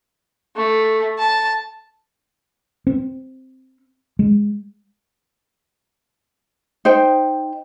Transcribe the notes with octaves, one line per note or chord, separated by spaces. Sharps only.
A3
A5
C4
G#3
D#4 C5 G5